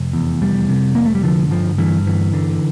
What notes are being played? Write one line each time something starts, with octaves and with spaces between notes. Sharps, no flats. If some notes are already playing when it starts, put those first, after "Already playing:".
Already playing: F1
E2
F1 G3
C3
F1 A#3
A3
G3
D3 F3
G1 F3
G2 E3
G1 E3
D3